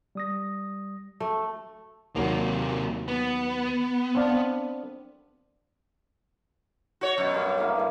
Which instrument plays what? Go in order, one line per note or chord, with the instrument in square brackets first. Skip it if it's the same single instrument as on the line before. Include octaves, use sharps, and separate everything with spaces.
[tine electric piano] G3 D#6 A#6
[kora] A3
[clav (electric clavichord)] D#2 F#3 [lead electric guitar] C3 A#3
[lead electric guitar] B3
[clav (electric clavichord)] C4 D4 F5
[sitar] F#4 C#5
F#2 B2
[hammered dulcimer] G2 C#4
D3 E3 A#3
G2 E3